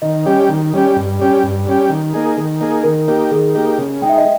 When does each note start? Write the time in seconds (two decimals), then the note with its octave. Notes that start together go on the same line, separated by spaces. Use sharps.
0.02 D#3 D#5
0.26 G3 C#4 G4
0.49 D#3
0.73 G3 C#4 G4
0.96 G2
1.19 G3 C#4 G4
1.43 G2
1.67 G3 C#4 G4
1.90 D#3
2.14 A#3 D#4 G#4
2.38 D#3
2.61 A#3 D#4 G#4
2.84 D#3 A#4
3.08 A#3 D#4 G4
3.31 D#3 G#4
3.55 A#3 D#4 G4
3.78 C#3
4.02 G#3 D#4 G5
4.09 E5
4.18 D#5